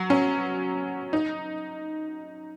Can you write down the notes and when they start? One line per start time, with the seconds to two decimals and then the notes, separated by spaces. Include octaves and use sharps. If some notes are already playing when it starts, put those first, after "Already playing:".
Already playing: F#3
0.10 C#4
1.13 D#4